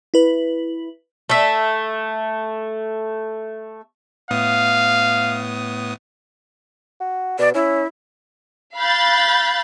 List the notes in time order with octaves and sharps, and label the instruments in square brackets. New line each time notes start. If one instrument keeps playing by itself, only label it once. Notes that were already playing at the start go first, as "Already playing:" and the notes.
[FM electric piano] E4 B4
[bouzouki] A3 E5
[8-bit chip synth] A2 B3 D#6 [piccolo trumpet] F5
[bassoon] F#4
[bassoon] B2 [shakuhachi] D5
[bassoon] C#4 [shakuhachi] E4
[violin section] F5 B5 F#6 G6 A6